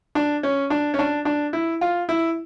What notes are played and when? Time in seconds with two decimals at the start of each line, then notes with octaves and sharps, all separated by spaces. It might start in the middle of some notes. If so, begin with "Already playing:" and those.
0.15 D4
0.43 C#4
0.70 D4
0.94 C#4
0.99 D4
1.25 D4
1.53 E4
1.81 F4
2.09 E4